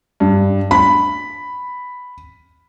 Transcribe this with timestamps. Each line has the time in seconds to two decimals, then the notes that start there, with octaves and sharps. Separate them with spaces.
0.20 G2
0.71 B5